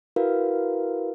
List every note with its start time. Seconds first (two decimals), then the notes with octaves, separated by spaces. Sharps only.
0.16 E4 F#4 A#4 B4 F5